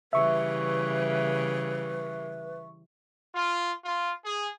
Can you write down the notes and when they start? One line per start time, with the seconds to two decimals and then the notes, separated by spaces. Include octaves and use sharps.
0.13 C#3 E3 G3 B4 E5 C#6
3.33 F4
3.84 F4
4.23 G#4